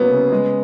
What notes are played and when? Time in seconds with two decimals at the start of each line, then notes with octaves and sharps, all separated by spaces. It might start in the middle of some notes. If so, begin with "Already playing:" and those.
Already playing: C2 F#3 A#3 B3 C#4
0.11 C#3
0.32 G#3